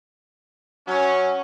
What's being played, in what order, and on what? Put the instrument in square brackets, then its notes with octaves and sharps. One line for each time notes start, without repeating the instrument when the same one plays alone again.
[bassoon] F#3 [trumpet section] C#4